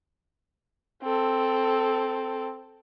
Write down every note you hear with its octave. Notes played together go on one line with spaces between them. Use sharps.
C4 A4